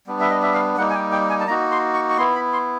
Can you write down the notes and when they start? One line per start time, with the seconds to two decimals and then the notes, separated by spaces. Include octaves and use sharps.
0.07 G3 B3 D4
0.20 E5
0.30 D#5
0.42 E5
0.54 F5
0.77 G3 A#3 D#4 F#5
0.90 G#5
0.95 G5
1.12 G5
1.30 G#5
1.40 A5
1.47 A#3 D#4 F#4 A#5
1.71 C6
1.94 C#6
2.10 C#6
2.18 B3 E4 C6
2.35 B5
2.53 C6